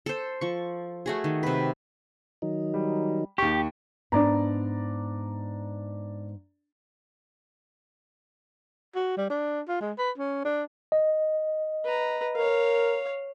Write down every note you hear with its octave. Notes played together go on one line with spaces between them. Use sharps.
A4 C5
F3 C#6
A3 F#4 G#4
D#3
C3 B4
D#3 F#3 D#4
G3
D#2 G4 C#6
G#2 B3 D4 D5 A#5
F#4
G3
D4
F4
G#3
B4
C#4
D4
D#5
B4 A#5
A#4 C#5 F5